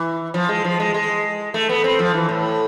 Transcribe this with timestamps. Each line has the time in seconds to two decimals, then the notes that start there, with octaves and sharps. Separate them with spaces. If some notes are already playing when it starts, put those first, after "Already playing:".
Already playing: E3
0.34 F3
0.49 G#3
0.64 F3
0.80 G#3
0.94 G#3
1.54 A3
1.69 B3
1.84 C4
1.99 F3
2.14 E3
2.29 A2